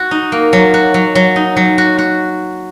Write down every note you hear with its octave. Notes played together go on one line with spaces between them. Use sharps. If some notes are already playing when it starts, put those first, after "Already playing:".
Already playing: F#4
D#4
A#3
F#3
F#4
F#3
F#3
D#4
F#3
F#4
F#4